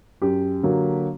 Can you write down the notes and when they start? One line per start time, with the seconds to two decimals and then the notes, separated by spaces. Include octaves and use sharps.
0.22 F#2 G4
0.63 D3 F#3 A#3